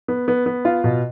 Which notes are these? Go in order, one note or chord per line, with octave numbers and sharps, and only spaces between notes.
B3
B3
B3
F4
B2